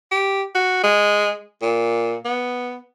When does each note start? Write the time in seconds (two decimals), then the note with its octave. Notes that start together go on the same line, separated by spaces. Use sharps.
0.12 G4
0.55 F#4
0.83 G#3
1.62 A#2
2.25 B3